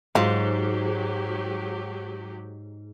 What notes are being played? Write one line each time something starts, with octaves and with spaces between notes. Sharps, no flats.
G#2 F#3 D#4 F4 G4